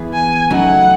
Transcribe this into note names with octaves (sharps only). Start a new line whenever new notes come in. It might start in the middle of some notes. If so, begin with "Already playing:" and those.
Already playing: E3 B3 E4 G#4 B4
G#5
E2 C#3 F#3 A3 D#4 F#5